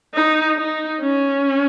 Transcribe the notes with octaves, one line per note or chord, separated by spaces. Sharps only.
D#4
D#4
C#4